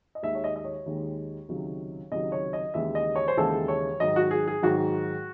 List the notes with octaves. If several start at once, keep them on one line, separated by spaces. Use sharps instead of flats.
D#5
D#2 D#3 G#3 E5
C#5
D#5
D#5
C#5
D#2 D#3 G#3
C#2 C3 D#3 F#3
C#2 C3 D#3 F#3 D#5
C#5
D#5
D#2 C#3 E3 G#3 E5
D#5
C#5
C5
D#2 C#3 E3 G#3 A4
C#5
G#2 D#3 F#3 D#5
F#4
G#4
G#4
G#2 D#3 F#3 F#4